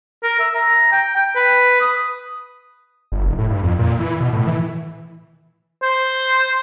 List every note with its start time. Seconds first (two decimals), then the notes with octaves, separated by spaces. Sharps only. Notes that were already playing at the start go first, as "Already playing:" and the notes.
0.23 A#4
0.40 E5
0.55 A#5
0.92 G5
1.16 G5
1.36 B4
1.81 D#6
3.12 G1
3.25 F1
3.38 A2
3.50 G2
3.63 F2
3.79 A#2
3.99 E3
4.20 B2
4.33 A2
4.47 E3
5.83 C5